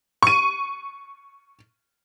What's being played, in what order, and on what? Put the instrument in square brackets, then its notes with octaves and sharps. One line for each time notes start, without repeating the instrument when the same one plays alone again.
[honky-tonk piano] C#6 D#7